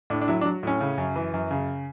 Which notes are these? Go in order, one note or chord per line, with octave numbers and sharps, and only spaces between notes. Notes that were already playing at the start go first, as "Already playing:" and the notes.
A2 D4
D4
F#3 E4
D4
F#3
A2 C#4
C#3
F#2
E3
F#2
C#3